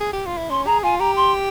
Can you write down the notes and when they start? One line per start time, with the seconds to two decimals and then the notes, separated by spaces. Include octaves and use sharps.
0.00 G#4
0.13 G4
0.26 F4
0.37 E4
0.50 C#4 C6
0.66 G#4 A#5
0.83 F4 G#5
1.00 G4 A#5
1.16 C6